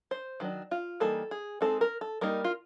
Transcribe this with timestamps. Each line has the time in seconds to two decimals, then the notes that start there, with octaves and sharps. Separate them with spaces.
0.11 C5
0.40 D#3 F#3 D4
0.71 F4
1.00 E3 G3 A#3 D#4 A4
1.31 G#4
1.61 G#3 C4 D#4 A4
1.81 A#4
2.01 A4
2.21 G3 A#3 D#4 A#4
2.44 F4